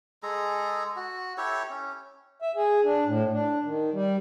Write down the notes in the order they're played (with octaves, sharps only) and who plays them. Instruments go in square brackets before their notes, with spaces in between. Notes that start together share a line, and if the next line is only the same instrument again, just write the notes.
[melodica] G#3 G#4 A4 A#5
F#4
E4 G4 A4 C#5
C#4
[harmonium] E5
G#4
D4
A2
D4
D#3
G3